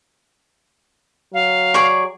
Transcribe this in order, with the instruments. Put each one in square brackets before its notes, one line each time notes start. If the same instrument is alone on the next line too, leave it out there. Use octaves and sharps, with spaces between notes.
[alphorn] F#3 [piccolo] F5
[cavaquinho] G#4 D5 C#6